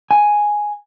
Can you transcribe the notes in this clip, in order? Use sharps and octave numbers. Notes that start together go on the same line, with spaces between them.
G#5